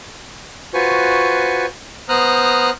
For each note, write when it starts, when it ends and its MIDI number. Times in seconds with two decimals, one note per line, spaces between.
0.74 1.66 65
0.74 1.66 66
0.74 1.66 71
0.74 1.66 72
0.74 1.66 80
0.74 1.66 85
2.09 2.70 59
2.09 2.70 72
2.09 2.70 82
2.09 2.70 87
2.09 2.70 89
2.09 2.70 90